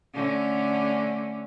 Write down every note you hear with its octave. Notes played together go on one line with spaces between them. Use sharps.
D3 A3 C#4